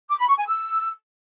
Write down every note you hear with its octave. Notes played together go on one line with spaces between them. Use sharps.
D6
B5
C#6
G#5
E6